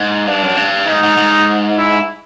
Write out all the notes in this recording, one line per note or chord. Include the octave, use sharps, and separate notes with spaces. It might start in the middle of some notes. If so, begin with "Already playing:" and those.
Already playing: G#2
G2 D4
F#2
G2
G#2 D#4
G#2
G#2
E4